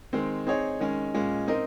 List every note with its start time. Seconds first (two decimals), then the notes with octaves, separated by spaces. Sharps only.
0.13 D#3 G#3 C4
0.47 C4 D#4 G#4 C#5
0.80 D#3 G#3 C#4
1.14 A#2 G#3 C#4
1.48 C4 D#4 A#4 D#5